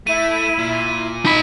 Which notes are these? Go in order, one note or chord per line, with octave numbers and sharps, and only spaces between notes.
A3 E4 D#7
A#2
D#4 D#5 B5